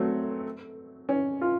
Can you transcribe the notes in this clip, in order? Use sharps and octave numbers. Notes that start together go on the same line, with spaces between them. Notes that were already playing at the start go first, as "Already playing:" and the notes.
Already playing: F#3 A3 C4
C#4
F4